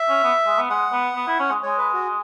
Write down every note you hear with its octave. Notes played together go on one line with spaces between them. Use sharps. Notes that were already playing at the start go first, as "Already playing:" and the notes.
Already playing: E5
C#4
B3
G#3
B3
G#3 F#5
B3
B3
E4
C#4
G#3
G#3 C#5
B4
F#4